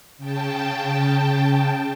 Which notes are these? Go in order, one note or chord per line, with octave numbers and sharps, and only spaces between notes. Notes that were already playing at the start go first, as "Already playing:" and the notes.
C#3 G5 A5